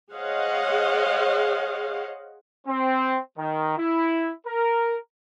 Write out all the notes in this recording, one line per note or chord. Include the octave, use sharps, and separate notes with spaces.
G#4 C5 C#5 D#5 F5 F#5
C4
D#3
E4
A#4